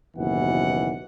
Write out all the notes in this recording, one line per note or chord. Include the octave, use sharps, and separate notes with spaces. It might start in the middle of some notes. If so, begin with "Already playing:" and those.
F#1 D#2 B2 E3 F#5